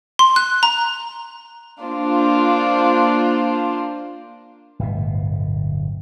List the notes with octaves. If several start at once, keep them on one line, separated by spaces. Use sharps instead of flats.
C6
F#6
A#5
A#3 D4 F4 C5
D1 G1 B2